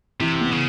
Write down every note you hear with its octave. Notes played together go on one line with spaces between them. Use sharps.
C3 E3
B3
C#3